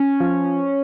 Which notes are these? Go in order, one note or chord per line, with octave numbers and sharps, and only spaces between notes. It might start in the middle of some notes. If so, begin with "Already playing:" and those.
Already playing: C#4
F3